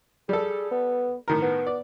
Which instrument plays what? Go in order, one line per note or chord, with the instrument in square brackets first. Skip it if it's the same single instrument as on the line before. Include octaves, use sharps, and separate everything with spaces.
[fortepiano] G3 A4 [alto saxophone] G#4
[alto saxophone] B3
[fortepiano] A2 D#3 A#4
[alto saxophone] B3
[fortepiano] D5